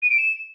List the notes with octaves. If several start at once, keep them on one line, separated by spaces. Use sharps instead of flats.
D#7
D7
E7